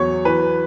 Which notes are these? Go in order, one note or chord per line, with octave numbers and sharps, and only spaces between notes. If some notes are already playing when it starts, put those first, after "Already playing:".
Already playing: E2 F#3 C#5
E3 B4